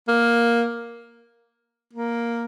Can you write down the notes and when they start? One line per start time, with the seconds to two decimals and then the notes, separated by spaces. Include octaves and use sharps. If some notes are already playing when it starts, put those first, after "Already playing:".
0.08 A#3
1.93 A#3